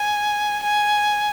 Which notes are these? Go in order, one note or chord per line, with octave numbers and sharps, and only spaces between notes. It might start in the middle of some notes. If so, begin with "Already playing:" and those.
Already playing: G#5
G#5